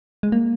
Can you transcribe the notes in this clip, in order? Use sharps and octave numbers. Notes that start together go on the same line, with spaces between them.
G#3
A#3